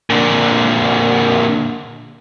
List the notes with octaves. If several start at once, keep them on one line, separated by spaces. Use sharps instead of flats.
A#2 D3